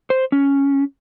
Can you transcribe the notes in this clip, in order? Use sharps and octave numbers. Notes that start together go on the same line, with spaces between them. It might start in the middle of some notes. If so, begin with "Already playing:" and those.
C5
C#4